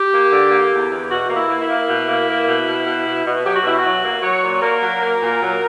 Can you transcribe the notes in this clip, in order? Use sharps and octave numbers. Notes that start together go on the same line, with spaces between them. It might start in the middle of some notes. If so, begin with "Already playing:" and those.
Already playing: G4
A#3
D3
A#3
E2
E2
B2 F#4
A#3
E4
A#3
E4
A#3
B2
A#3
A#3
B2
B2
B2
B2
B2
F#3 G4
F#4
B2 E4
F#4
F#3
A#3
F#3 C#5
A#2
A#3 A#4
F#3
A#3
A#2
F#3